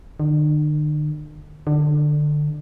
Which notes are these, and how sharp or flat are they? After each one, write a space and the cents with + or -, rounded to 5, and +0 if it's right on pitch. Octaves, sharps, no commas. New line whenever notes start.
D3 +45
D3 +20